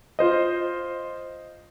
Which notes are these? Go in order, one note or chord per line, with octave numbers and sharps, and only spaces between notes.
F4 C5 D#5